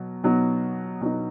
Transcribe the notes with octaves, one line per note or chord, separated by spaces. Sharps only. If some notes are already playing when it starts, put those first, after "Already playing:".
Already playing: B2 F#3
B2 F#3 B3 D#4
B2 F#3 B3 D#4